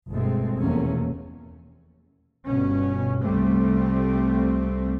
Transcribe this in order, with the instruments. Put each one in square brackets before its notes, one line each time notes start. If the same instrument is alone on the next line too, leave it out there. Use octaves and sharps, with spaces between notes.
[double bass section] G1 B2 G#3 A3 C4
F1 E2 B2 A3 A#3 C#4
G1 B2 C#4
C2 G3 A3 C4